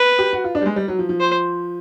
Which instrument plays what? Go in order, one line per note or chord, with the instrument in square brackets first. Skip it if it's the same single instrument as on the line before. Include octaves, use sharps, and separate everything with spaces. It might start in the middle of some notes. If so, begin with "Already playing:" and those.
Already playing: [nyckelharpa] B4
[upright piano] G4
F#4
F4
D4
G3
G#3
G3
F#3
F3
F3
[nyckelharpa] C5